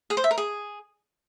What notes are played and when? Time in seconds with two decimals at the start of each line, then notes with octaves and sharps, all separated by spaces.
0.10 G#4
0.17 C5
0.24 E5
0.31 A#4
0.38 G#4